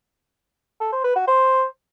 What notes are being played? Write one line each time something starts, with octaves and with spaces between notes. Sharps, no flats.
A4
C5
B4
F#4
C5